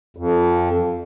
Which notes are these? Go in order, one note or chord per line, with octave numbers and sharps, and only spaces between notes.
F2